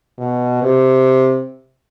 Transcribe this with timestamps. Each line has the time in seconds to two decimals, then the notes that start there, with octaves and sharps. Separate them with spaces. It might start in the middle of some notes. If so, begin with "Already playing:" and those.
0.18 B2
0.62 C3